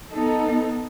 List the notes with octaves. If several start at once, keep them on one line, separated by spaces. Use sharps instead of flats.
B3 D#4 A4